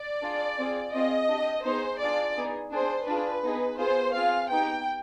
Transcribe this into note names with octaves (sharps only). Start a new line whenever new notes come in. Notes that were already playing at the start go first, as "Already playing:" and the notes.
Already playing: D5
D4 F4 G#4
C4 F4 G#4
C4 F4 G#4 D#5
D4 G4
B3 D#4 G#4 C5
D4 F4 G#4 D5
B3 D#4 G#4
D4 G#4 C5
D4 F4 G#4 B4
B3 D#4 G#4
B3 F4 G#4 C5
C4 F4 G#4 F5
B3 D#4 G4 G5